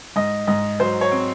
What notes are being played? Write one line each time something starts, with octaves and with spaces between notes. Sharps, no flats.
G#2 D#5
G#2 D#5
F#3 C5
C#5
C4